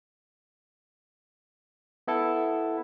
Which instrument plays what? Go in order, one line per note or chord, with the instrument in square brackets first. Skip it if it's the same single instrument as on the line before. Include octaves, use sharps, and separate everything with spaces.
[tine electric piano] B3 E4 A4